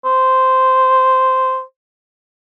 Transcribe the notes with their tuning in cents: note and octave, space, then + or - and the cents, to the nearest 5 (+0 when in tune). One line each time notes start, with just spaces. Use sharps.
C5 -10